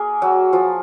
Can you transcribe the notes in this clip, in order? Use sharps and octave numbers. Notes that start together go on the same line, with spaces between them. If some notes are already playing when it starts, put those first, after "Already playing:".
Already playing: A#3 G#4 A#4
F#3 F#4
F3 F4